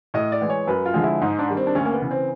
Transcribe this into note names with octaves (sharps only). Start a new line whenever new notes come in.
A2 D#5
D5
E3 G#3
C#5
F#2 B4
F4
D3 F3 G#3
E4
G#2 D#4
D4
D#3 G3
C4
D4
D2 C#4
A#3
B3
C#3 E3
C4